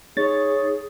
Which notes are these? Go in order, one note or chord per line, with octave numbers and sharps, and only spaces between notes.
D#4 G#4 C#5 A6